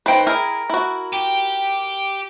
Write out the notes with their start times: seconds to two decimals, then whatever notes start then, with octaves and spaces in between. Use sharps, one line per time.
0.06 D#3 A#3 B4 C5 G5
0.27 E4 G#4 A#4
0.70 E4 F#4
1.13 G4